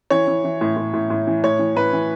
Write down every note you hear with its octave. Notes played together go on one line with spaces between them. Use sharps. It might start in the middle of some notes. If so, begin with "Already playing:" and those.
E3 C#5
E3
E3
A2
A2
A2
A2
E3
A2 C#5
E3
A2 B4
E3